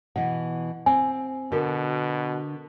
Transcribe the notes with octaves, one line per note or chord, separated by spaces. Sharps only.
B2 E3 F#5
C4 G#5
B2 D3 F#4 A#4